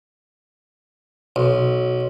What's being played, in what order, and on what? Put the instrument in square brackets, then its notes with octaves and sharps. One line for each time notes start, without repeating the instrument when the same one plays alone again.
[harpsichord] B1